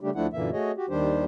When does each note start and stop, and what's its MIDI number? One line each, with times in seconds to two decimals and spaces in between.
0.01 0.10 49
0.01 0.10 55
0.01 0.10 57
0.01 0.10 62
0.01 0.10 67
0.15 0.27 38
0.15 0.27 53
0.15 0.27 57
0.15 0.27 62
0.15 0.27 64
0.15 0.27 78
0.33 0.50 42
0.33 0.50 46
0.33 0.50 50
0.33 0.50 52
0.33 0.50 58
0.33 0.50 76
0.53 0.72 57
0.53 0.72 66
0.53 0.72 68
0.53 0.72 73
0.53 0.72 75
0.77 0.86 66
0.77 0.86 67
0.90 1.25 39
0.90 1.25 51
0.90 1.25 55
0.90 1.25 62
0.90 1.25 67
0.90 1.25 72